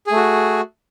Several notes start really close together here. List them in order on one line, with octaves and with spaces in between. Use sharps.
G#4 A3 F#4